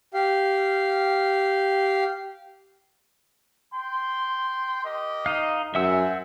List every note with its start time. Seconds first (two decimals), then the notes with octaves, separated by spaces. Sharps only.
0.14 G4 F5
3.74 G5 C6
4.84 G4 A#4 D#5
5.26 D#4 F5
5.75 F#2 C4 E5 F#5 G#5 E6